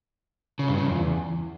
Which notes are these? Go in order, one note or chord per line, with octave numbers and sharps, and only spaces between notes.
C#3
G2
C#3
F2
E2